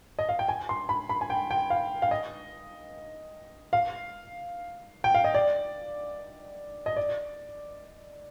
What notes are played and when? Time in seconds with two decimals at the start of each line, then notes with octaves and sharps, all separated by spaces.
0.19 D#5
0.29 F5
0.39 G5
0.48 G#5
0.69 C6
0.89 B5
1.09 B5
1.21 G#5
1.30 G5
1.51 G5
1.70 F5
2.02 F5
2.11 D#5
3.73 F5
5.04 G5
5.14 F5
5.24 D#5
5.34 D5
6.86 D#5
6.96 D5